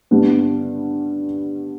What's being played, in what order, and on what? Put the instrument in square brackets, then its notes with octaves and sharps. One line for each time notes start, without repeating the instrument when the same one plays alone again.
[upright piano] G2 D3 G3 B3 D4